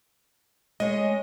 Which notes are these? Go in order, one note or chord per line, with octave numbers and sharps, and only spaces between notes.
G#3 C#4 D#5